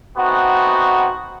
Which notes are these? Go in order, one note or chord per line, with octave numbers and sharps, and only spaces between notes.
A3 B3 C4 D#4 F#4